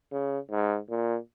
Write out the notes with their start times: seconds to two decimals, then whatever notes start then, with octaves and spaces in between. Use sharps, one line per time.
0.12 C#3
0.51 G#2
0.90 A#2